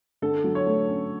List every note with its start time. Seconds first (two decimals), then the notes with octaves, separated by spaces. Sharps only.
0.22 D3 A4
0.44 F#3
0.55 C#5
0.66 A3
0.89 C#4